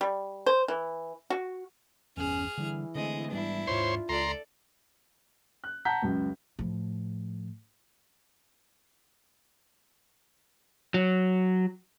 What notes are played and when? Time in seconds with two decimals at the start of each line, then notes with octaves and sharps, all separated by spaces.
0.01 G3
0.46 C5
0.68 E3
1.30 F#4
2.17 G1 E2 C#4 G#4 F6
2.58 D3 E3 G3
2.95 D3 G#3 A3 C4 D#5
3.31 G#2 G3 B3 D4 E4
3.67 D#2 G#2 F4 C5 C#5 C6
4.09 C#2 A4 D5 A#5 C6
5.64 F#6
5.85 F#5 A5 A#5 G6 B6
6.02 C#2 F#2 C#3
6.59 A2 F3
10.94 F#3